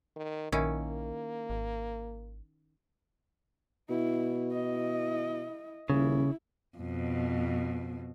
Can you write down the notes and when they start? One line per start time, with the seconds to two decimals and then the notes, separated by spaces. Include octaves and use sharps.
0.16 D#3
0.52 A#1 D#3 A#3 C#4 E4
1.50 G#1
3.90 B2 E4
4.52 E4 D#5
5.90 D#1 C#3 E4
6.78 F2 B2